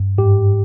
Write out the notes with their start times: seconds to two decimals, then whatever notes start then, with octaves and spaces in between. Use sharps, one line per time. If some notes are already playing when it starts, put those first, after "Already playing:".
Already playing: G2
0.18 G#2 G4